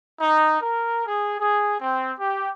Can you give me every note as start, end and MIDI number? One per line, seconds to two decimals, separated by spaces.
0.21 0.58 63
0.61 1.05 70
1.06 1.39 68
1.40 1.76 68
1.81 2.13 60
2.20 2.51 67